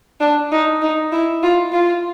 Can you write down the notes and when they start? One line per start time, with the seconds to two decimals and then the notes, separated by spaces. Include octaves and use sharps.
0.20 D4
0.51 D#4
0.81 D#4
1.12 E4
1.43 F4
1.72 F4